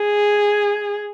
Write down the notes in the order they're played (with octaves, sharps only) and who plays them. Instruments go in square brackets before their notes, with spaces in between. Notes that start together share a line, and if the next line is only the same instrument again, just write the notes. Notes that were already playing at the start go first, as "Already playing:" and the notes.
Already playing: [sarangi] G#4